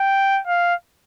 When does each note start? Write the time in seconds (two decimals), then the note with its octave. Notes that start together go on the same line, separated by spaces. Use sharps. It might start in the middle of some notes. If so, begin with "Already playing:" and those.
Already playing: G5
0.47 F5